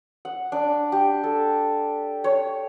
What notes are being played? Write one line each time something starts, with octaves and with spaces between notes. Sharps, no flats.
F#5
D4
G4
A4
C#5